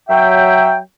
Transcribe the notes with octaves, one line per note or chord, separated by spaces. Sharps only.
F#3 E5 G5